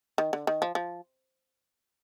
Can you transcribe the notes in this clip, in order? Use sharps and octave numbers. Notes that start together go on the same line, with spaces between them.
D#3
D3
D#3
F3
F3